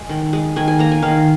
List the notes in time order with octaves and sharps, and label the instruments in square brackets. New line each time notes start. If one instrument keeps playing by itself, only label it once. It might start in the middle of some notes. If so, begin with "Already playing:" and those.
Already playing: [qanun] G#3 G#4
D#3
G#3
D#3 G#5
G#5
A#3 A#5
G#5
D#3 F5